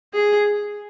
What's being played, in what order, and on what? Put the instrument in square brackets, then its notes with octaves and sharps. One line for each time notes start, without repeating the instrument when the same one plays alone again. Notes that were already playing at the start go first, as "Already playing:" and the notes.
[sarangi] G#4